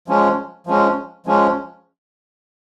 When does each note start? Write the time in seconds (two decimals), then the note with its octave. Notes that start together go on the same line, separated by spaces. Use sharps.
0.08 F3 G#3 C#4
0.67 F3 G#3 C#4
1.26 F3 G#3 C#4